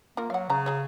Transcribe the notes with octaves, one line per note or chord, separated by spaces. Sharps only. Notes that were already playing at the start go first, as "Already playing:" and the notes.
A#3 F4 A#4
F#3 F5 F#5
C#3 C#4 A#5
F#4 G#4 C#5